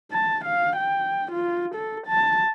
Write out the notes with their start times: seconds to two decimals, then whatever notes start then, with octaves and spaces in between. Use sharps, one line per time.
0.12 A5
0.45 F5
0.77 G5
1.32 F4
1.75 A4
2.07 A5